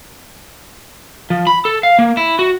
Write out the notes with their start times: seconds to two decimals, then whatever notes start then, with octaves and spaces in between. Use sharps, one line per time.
1.30 F3
1.47 B5
1.65 A4
1.83 F5
1.99 A#3
2.17 E4
2.39 F#4